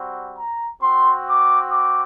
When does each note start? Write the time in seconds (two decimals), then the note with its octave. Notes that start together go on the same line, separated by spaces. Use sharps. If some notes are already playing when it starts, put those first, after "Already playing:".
Already playing: G3 C4 F#4
0.38 A#5
0.81 C4 F#4 C6
1.27 D6
1.71 D6